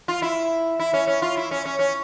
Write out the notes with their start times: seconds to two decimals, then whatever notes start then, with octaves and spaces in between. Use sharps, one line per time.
0.08 F4
0.22 E4
0.80 E4
0.94 C#4
1.08 C#4
1.22 F4
1.37 E4
1.51 C#4
1.66 C#4
1.79 C#4